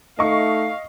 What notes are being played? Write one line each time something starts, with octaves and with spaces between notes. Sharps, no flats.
A3 D#4 D#5 F5 C#6